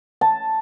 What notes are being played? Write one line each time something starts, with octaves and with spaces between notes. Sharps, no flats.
A5